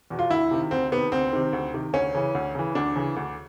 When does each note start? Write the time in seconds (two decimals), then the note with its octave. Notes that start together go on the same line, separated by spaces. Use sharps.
0.10 E2 B2
0.19 F4
0.30 D2 E4
0.51 C3 D#3
0.71 D2 C4
0.92 C3 D#3 B3
1.12 D2 C4
1.33 C3 D#3
1.53 D2
1.74 C3 D#3
1.93 D2 C#4
2.15 C#3 E3
2.35 D2
2.55 C#3 E3
2.75 D2 D4
2.96 C#3 E3
3.16 D2